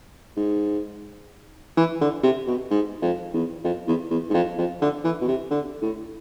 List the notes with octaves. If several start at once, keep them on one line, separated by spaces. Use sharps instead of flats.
G#2
E3
D3
C3
B2
G#2
F2
E2
F2
E2
E2
G#2
F2
F2
D3
E3
B2
C3
D3
A2